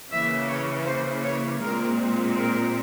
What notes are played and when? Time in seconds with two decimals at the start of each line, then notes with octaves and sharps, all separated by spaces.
0.10 C#3 E3 A#3 E5
0.48 C#5
0.85 C5
1.23 C#5
1.60 A#2 G#3 C4 A#4
2.36 A#4